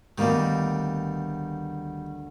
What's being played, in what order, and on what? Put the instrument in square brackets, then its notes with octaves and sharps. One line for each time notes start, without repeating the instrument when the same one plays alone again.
[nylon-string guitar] D2 A#3 B3 [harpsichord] D#3 G3